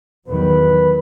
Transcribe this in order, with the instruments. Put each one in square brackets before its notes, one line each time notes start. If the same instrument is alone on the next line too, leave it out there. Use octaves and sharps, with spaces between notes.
[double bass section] E2 D#3 F#3 [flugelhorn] B4